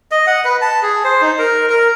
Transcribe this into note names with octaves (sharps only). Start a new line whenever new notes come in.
D#5
F#5
B4
A5
G#4
C5
D#4
A#4
A#4